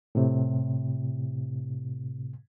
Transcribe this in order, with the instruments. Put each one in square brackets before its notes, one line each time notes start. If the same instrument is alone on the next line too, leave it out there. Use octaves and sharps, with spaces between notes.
[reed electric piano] A2 C3